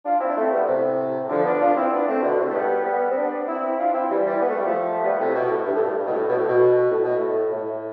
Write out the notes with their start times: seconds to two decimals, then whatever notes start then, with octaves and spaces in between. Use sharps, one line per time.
0.05 D4 F4
0.20 C4 E4
0.29 D4
0.37 A3 C4
0.52 G3 B3
0.67 A2 C3
1.29 D3 F3
1.45 B3 D4
1.61 D4 F4
1.76 C4 E4
1.92 B3 D4
2.08 A3 C4
2.23 B2 D3
2.39 A2 C3
2.50 A3
2.54 G3 B3
2.85 G3 B3
3.10 C4
3.16 B3 D4
3.47 C4 E4
3.79 D4 F4
3.94 C4 E4
4.10 E3 G3
4.26 E3 G3
4.41 B3
4.49 A3
4.58 G3
4.66 F3 A3
5.03 G3 B3
5.19 A2 C3
5.34 B2
5.51 A2
5.66 G2
5.76 A2
5.82 G2
5.98 G2
6.05 B2
6.12 A2
6.28 B2
6.38 A2
6.48 B2
6.90 A2
7.04 B2
7.17 A2
7.53 A2